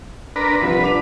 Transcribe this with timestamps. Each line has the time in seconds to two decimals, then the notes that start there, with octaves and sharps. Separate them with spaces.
0.36 D4 A#4 B4 C6
0.61 C2 F3 B4
0.82 D4 D6 F7